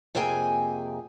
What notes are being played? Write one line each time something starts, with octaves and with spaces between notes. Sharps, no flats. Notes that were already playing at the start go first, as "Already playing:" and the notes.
F2 C3 A#3 G#4 G5 G#5